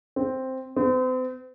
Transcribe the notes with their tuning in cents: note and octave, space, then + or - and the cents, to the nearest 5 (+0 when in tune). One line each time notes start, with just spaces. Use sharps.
C4 +0
C4 -40